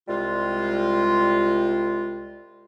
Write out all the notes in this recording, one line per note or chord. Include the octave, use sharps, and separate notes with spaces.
C2 G3 G#3 F4